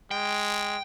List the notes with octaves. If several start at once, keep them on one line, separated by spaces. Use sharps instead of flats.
G#3 G5